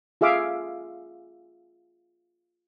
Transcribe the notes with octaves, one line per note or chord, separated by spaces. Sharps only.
F4 G#4 E5 F5 D6